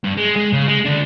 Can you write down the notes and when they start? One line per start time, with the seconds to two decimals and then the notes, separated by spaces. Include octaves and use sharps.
0.04 G2
0.17 G#3
0.36 G#3
0.53 C#3
0.67 G#3
0.85 D2 D4